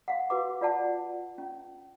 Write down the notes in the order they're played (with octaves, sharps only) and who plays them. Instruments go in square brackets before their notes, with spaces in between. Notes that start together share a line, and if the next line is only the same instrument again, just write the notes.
[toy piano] F5 F#5
F#4 B4 D6
F4 D5 F#5 A5
C#4